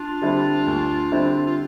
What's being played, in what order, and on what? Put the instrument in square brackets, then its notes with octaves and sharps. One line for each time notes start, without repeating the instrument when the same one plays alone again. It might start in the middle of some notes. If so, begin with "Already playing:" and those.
Already playing: [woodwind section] D4 F4
[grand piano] D3 G3 C4 E4
D2
D3 G3 C4 E4
[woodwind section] F4